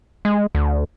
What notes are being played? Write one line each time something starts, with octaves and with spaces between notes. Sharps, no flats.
G#3
D2